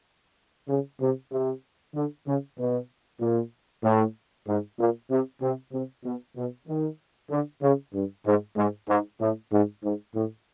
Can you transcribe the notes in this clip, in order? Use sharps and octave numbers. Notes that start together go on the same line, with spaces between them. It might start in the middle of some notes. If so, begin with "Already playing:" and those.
C#3
C3
C3
D3
C#3
B2
A#2
A2
G#2
A#2
C3
C3
C3
B2
B2
D#3
D3
C#3
G2
G#2
G#2
G#2
A2
G#2
G#2
A2